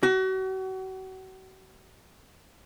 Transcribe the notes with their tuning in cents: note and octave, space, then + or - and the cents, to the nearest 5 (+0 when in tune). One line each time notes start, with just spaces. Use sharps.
F#4 +35